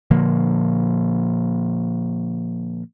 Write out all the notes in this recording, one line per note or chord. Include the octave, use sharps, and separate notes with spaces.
A#2 D3 F3 A#3